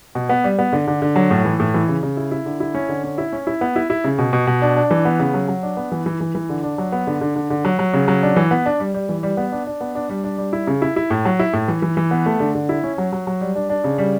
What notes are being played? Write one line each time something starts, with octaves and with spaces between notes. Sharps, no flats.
B2
B3
G3
B3
D3
D3
D3
F#3
A2
E3
A2
E3
C#3
C#3
E4
E4
D3
E4
C#4
D3
C#4
E4
C#4
E4
B3
E4
E4
C#3
B2
B2
B2
D4
D4
E3
B3
C#3
F#3
F#3
D4
B3
E3
E3
E3
E3
D3
D4
F#3
B3
D3
D3
D3
D3
F#3
F#3
C#3
F#3
D4
E3
B3
D4
G3
G3
E3
G3
B3
D4
D4
B3
D4
G3
D4
G3
E4
C#3
E4
E4
A2
F#3
E4
A2
E3
E3
E3
B3
A3
D3
D3
E4
C#4
F#3
F#3
F#3
G3
D4
D4
C#3
G3